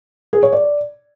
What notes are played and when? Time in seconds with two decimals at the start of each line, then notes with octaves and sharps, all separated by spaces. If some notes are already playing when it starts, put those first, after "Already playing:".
0.33 G#4
0.43 C#5
0.52 D5